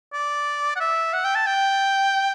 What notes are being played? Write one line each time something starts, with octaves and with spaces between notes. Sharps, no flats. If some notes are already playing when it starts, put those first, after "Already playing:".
D5
F#5
E5
F#5
G5
A5
G5